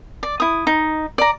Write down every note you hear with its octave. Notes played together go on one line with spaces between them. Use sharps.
D5
E4 D#6
D#4
D5 A#5